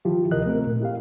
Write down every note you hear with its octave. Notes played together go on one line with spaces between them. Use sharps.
D#3 F3 E4 F4 G4
D2 C3 A#4 D#5 F#6
A3 C4 A#4
A#2
E4 G4 F5